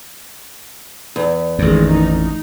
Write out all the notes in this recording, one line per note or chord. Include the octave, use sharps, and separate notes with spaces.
E2
A1 F2 D#3 G#3
D#4